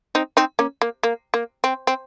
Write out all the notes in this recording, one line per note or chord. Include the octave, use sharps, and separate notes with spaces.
C4 D#4
C4 D#4
A#3 C#4
A#3
A#3
A#3
C4
C4